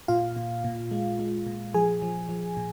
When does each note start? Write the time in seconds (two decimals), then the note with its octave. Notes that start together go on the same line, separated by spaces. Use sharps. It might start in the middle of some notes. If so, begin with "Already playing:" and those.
0.08 A#2 F4 F5
0.37 A#2
0.64 A#2
0.91 G#3
1.19 G#3
1.47 A#2
1.74 F3 G#4 G#5
2.02 F3
2.29 F3
2.57 A#2